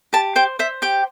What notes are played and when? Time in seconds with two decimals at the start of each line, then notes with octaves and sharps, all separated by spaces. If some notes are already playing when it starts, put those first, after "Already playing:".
0.13 G4 A5
0.36 C5 G5
0.59 C5 E5
0.82 G4 G5